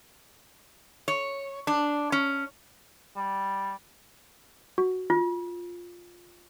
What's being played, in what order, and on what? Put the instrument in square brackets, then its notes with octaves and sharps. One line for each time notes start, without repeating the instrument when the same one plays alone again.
[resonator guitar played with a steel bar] C#5
D4
C#4
[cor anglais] G3
[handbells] F#4
[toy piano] F4